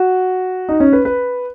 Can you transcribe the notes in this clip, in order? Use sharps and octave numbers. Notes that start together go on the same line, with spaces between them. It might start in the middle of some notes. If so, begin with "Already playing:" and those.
Already playing: F#4
D#4
C#4
B4
B4